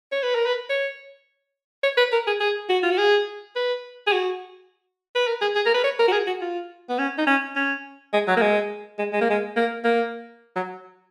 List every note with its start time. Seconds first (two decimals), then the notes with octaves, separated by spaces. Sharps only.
0.12 C#5
0.23 B4
0.35 A#4
0.46 B4
0.70 C#5
1.83 C#5
1.97 B4
2.12 A#4
2.27 G#4
2.40 G#4
2.69 F#4
2.83 F4
2.91 F#4
2.98 G#4
3.56 B4
4.07 G#4
4.13 F#4
5.15 B4
5.28 A#4
5.41 G#4
5.55 G#4
5.66 A#4
5.74 B4
5.84 C#5
5.99 A#4
6.08 F#4
6.12 G#4
6.27 F#4
6.41 F4
6.89 B3
6.99 C#4
7.18 D#4
7.27 C#4
7.56 C#4
8.13 G#3
8.28 F#3
8.37 A#3
8.42 G#3
8.98 G#3
9.13 G#3
9.21 A#3
9.30 G#3
9.56 A#3
9.84 A#3
10.56 F#3